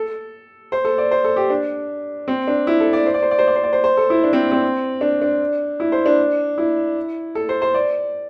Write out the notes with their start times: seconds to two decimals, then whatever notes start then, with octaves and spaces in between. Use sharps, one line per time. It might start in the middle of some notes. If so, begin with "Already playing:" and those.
Already playing: A4
0.72 C5
0.85 A4
0.98 D5
1.11 C5
1.24 A4
1.36 G4
1.50 D4
2.28 C4
2.47 D4
2.67 E4
2.80 A4
2.93 D5
3.06 C5
3.14 D5
3.22 C5
3.31 D5
3.38 C5
3.47 D5
3.56 C5
3.63 D5
3.73 C5
3.84 C5
3.97 A4
4.10 E4
4.24 D4
4.33 C4
4.52 C4
5.01 D4
5.21 D4
5.80 E4
5.92 C5
6.06 D4
6.58 E4
7.35 A4
7.49 C5
7.62 C5
7.74 D5